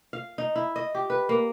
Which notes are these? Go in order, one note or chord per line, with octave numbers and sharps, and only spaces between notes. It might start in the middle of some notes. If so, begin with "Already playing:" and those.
F5
D#4
E4
D#5
G4
B4
A#3